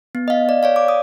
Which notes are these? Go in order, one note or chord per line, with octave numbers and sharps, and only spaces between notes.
B3
D#5 F5
D5
C#5 D5 F5
D6
D#6